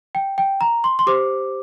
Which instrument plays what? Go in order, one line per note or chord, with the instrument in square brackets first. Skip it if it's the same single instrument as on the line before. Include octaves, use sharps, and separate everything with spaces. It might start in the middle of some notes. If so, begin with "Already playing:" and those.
[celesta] G5
G5
A#5
C6
C6
G4 C5 D6